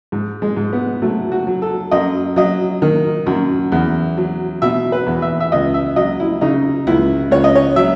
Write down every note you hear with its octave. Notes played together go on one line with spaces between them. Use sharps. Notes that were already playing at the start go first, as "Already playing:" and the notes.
G#2
G#3
G#2
B3
F#3 A3
F#4
F#3
A4
F#2 D#5
F#3 D#5
D#3
F#2
E2
F#3
B2 E5
B4
E2
E5
E5
C#2 D#5
E5
F#3 D#5
E4
C#3 D#4
C#2 E4
C#2 C#5
D#5
C#5
F#3 E5